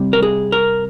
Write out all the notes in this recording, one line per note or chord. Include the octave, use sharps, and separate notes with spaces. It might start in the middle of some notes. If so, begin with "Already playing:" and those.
Already playing: C3 G3
A#4
G#4
A#4